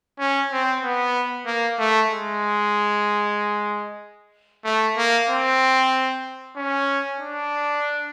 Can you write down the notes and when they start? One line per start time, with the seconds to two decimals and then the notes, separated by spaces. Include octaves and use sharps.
0.19 C#4
0.52 C4
0.83 B3
1.46 A#3
1.79 A3
2.11 G#3
4.65 A3
4.97 A#3
5.30 C4
6.56 C#4
7.20 D4